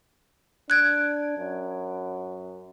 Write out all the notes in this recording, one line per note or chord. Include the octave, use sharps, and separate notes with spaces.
D4 F#6 G#6 D7
F#2